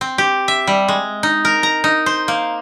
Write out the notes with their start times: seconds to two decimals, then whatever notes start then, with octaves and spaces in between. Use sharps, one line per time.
0.01 C4
0.18 G4
0.48 E5
0.67 G3
0.88 G#3
1.23 D#4
1.45 A#4
1.63 A#5
1.84 D#4
2.06 C5
2.28 A#3